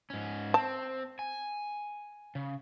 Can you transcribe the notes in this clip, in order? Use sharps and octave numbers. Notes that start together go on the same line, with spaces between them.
G#2 C#4
C4 A5
G#5
C#3